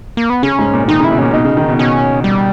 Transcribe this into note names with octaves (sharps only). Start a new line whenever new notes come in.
A#3
B3
C#3 C#4
G#2
A#2
D#3 D#4
C#3
E4
B2
A#2 C#4
B2 D#4
C#3
D#3
B2
B2 C#4
G3